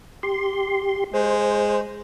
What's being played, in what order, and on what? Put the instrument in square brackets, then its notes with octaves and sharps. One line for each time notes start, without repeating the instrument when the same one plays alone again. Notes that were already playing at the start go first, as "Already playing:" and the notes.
[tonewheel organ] G4 C6
[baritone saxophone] G#3 [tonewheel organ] C5